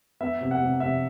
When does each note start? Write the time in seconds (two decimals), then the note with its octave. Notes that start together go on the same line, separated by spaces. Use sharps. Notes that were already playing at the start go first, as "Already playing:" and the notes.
0.21 B3 E5
0.41 C3
0.51 F#5
0.62 C3
0.80 C3 E5